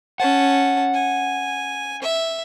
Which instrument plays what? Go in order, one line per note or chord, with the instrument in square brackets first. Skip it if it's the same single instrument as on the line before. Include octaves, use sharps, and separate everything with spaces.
[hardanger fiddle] C#4 A5 [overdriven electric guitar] F#5
[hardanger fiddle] G#5
E5